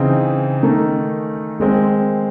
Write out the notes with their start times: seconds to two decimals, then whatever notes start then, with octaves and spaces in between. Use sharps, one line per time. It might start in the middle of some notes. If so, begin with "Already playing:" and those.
Already playing: C#3 E3 C4 D#4
0.63 D#3 A3 D#4
1.60 D#3 G#3 C4